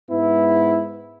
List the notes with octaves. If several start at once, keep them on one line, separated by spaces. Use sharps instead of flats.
G#2 B3 E4